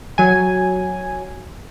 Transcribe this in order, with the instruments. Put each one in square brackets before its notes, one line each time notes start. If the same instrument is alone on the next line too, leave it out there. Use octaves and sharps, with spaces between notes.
[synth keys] F#3 G#5